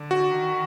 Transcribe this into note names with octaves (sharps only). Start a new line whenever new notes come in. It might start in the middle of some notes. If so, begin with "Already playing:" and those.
Already playing: D3
F#4
D#3